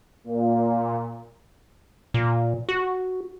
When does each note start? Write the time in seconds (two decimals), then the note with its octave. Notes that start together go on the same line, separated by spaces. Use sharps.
0.24 A#2
2.14 A#2
2.69 F#4